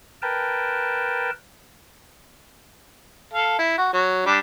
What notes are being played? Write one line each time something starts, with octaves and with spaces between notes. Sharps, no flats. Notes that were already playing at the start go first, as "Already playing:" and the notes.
A#4 B4 G5 A5
A4 F5
E4
F#4
F#3
G3 D4